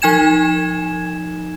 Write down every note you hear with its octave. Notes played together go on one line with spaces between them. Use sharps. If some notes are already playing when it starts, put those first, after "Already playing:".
F3 D#4 G#5 G#6 E7